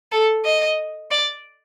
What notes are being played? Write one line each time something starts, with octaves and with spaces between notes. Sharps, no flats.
A4
D#5
D5